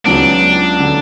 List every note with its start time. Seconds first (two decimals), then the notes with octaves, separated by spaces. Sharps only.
0.06 C#2 C#3 F#3 B3 D4
0.80 D3 F#3